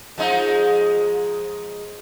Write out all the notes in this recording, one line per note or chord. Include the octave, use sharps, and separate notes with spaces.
F3 G#3 D#4